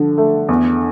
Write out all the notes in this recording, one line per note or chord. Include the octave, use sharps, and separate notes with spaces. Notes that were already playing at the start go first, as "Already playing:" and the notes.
Already playing: D3 F3
A3
E2